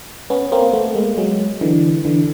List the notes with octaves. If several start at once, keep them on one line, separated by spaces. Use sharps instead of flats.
B3 C#4
A#3 C4
A3 B3
G#3 A#3
F#3 G#3
D3 E3
D3 E3